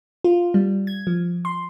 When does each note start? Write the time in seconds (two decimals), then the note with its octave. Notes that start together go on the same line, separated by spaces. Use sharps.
0.24 F4
0.54 G3
0.87 G#6
1.07 F3
1.45 C6